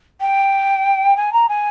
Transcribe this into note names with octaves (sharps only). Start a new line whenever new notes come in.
G5
G#5
A#5
G#5